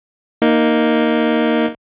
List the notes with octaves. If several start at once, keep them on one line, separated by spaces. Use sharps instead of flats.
A#3 D#4